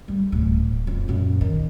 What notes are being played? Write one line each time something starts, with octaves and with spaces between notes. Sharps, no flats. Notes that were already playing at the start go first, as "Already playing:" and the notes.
G3
D1 A2
F2
F#2 A#2
D#3